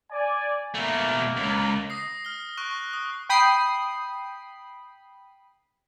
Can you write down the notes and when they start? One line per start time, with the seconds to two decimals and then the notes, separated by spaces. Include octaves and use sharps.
0.11 D5 G#5
0.75 B2 A3 A#3
1.37 C#2
1.90 D#6 A#6 C7
2.25 F6 G7
2.58 C#6 F#6 D7
2.93 D#6
3.29 G5 B5 D#6 C7